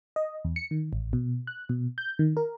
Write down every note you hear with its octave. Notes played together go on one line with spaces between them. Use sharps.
D#5
E2
C#7
D#3
A1
B2
F#6
B2
G6
D#3
A#4